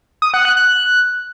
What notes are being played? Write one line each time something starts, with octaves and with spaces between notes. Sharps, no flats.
D#6
F#5
F#6
F#6